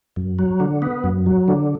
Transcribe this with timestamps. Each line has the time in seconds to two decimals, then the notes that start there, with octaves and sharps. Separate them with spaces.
0.16 F#2
0.39 F#3
0.60 D3
0.82 B3
1.04 F#2
1.26 F#3
1.48 D3